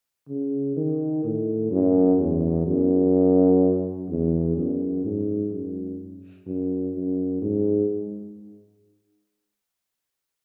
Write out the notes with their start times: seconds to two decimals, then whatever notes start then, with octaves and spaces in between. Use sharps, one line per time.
0.29 C#3
0.77 D#3
1.24 A2
1.71 F#2
2.19 E2
2.67 F#2
4.10 E2
4.57 F#2
5.05 G#2
5.53 F#2
6.47 F#2
6.95 F#2
7.42 G#2